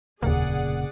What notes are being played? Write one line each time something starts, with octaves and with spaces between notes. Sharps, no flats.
F1 D#2 A#2 C#3 A#3 G#4 D5 F#5